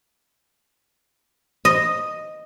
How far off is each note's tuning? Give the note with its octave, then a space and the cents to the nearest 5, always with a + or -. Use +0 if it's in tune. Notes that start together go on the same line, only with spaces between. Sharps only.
D#5 -5